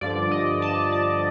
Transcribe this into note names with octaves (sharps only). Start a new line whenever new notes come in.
G2 D3 F3 D5
D#5
A5
A5